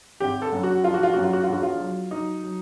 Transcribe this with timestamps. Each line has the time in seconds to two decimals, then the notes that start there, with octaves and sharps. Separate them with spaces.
0.20 G#1 G4
0.42 A4
0.53 F#2
0.63 F#4
0.84 F3 F4
0.94 F#4
1.03 F4
1.13 F#2 F#4
1.24 F4
1.33 F#4
1.43 F4
1.48 E1 F#4
1.63 F4
1.80 F#3
2.11 F#3 D#4
2.44 F#3